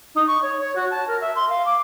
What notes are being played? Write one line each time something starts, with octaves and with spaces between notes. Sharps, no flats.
D#4
C#6
C#5
C#5
F#4
A5
A#4
E5
C6
F5
D6